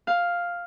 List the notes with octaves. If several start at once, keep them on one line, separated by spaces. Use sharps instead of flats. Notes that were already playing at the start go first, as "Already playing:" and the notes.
F5